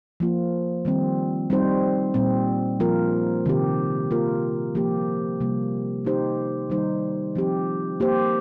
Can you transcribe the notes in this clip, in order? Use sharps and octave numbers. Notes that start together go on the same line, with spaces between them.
F3 A#3 F4
D#3 G3 C4
G3 C4 D#4 C5
A#2 G3 C4
F3 A#3 F4 A#4
C3 D#3 C4 G4
A#3 F4 A#4
F3 A#3 G4
C3 G3 A#3
A#3 D#4 G4 C5
D#3 G3 D#4 C5
F3 C4 G4
A#3 G4 C5